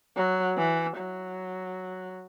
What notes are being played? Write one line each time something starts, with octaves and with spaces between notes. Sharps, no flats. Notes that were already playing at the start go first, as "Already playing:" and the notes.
F#3
E3
F#3